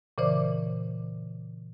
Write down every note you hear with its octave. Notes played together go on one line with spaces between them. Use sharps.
A#2 C#3 E3 C5 D5 D6